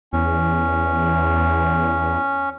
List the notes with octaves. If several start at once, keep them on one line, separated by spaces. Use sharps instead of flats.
E2 C#4